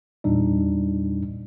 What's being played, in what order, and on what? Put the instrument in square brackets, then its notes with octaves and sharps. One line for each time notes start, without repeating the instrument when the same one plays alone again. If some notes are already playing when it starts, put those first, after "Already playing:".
[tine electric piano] E2 A#2 G3 D4 D#4